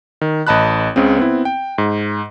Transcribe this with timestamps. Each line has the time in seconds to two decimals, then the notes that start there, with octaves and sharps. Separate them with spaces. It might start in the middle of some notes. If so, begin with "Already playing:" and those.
0.21 D#3
0.47 A1 D#5 A5 B5 F#6
0.96 C#2 C#3 C4
1.17 B3 C4 E4
1.45 G5
1.78 G#2